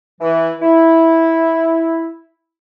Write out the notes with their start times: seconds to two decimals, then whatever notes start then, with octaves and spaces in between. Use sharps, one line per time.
0.21 E3
0.62 E4